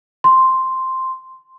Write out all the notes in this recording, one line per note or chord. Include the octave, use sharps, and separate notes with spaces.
C6